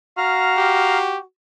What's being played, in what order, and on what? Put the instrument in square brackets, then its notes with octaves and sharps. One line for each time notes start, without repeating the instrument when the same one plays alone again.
[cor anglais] F#4 [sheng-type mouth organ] F5 A#5 F6
[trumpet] G4